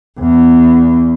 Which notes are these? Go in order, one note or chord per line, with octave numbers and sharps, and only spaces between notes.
E2